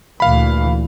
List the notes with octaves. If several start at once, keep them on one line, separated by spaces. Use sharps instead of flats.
D2 A#2 E3 F5 B5